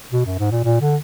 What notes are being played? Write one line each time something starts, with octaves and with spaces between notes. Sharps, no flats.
B2
F#2
G#2
A#2
A#2
D3